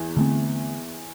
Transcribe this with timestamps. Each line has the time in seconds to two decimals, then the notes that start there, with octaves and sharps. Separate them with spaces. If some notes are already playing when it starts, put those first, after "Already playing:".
Already playing: E2 E3
0.17 D3 A3 C4